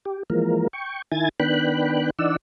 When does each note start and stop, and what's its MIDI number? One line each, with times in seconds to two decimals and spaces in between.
0.05 0.23 67
0.30 0.67 52
0.30 0.67 53
0.30 0.67 56
0.30 0.67 58
0.30 0.67 70
0.73 1.02 79
0.73 1.02 85
1.12 1.29 51
1.12 1.29 64
1.12 1.29 80
1.12 1.29 92
1.12 1.29 93
1.40 2.10 51
1.40 2.10 59
1.40 2.10 62
1.40 2.10 79
1.40 2.10 83
1.40 2.10 90
2.19 2.36 52
2.19 2.36 62
2.19 2.36 63
2.19 2.36 74
2.19 2.36 78
2.19 2.36 88